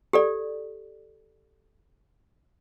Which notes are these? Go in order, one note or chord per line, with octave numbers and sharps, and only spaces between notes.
G4 A4 D5